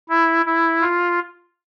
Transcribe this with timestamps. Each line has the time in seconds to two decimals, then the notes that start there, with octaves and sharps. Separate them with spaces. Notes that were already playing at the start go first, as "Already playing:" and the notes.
0.09 E4
0.46 E4
0.81 F4